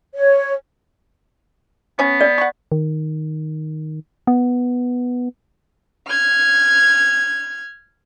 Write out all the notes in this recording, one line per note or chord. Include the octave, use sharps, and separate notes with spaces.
C#5
B3 C#4 C#5
D5
F#5 C#6
D#3
B3
F6 G#6